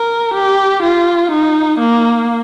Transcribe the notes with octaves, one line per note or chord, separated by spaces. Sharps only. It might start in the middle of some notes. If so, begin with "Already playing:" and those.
Already playing: A#4
G4
F4
D#4
A#3